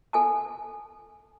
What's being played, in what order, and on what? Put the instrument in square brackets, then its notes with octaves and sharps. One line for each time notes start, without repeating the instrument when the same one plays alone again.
[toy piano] A4 G#5 A5